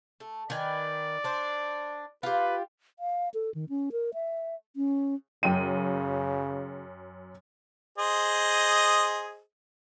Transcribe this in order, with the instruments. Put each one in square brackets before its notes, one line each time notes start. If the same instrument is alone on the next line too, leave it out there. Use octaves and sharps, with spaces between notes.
[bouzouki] A3
[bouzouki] D#3 B4 G#5 [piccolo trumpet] D5
[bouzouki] D4 C5
[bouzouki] F4 G4 [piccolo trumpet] B4
[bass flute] F5
A4
D#3
C#4
A#4
E5
C#4
[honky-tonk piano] F#2 G5 D#7 [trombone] C#3
[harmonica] G#4 C5 D#5